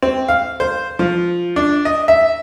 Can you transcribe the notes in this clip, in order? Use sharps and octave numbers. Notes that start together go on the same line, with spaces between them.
C4
F5
C5
F3
D4
D#5
E5